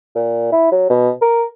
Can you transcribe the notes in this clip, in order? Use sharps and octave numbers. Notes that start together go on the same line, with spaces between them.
A#2
E4
F#3
B2
A#4